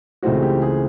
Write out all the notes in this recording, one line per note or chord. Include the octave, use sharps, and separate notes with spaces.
C#2 C#3 E3 A3 C4 F#4
G4
G#4